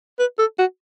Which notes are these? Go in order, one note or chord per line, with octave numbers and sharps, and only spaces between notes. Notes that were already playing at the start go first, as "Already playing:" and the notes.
B4
A4
F#4